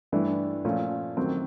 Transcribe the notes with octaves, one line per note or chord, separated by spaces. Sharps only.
G2 E3 A3 D4
A#2 F3 A3 C#4
F#2 D#3 F#3 A3 C4